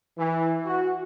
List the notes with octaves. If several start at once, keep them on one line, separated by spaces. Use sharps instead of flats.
E3
F#4